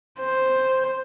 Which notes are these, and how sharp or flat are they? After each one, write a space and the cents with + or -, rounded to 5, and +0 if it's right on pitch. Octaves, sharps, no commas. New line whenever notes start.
C5 +0